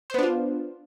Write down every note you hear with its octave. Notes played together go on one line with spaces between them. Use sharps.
B3 D4 F4 C5